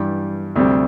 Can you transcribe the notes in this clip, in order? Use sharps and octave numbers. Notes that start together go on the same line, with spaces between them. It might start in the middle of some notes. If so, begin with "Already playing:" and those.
Already playing: G2 E3 G3
D2 C3 G3 C4